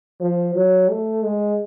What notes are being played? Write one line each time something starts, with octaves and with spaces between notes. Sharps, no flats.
F3
F#3
A3
G#3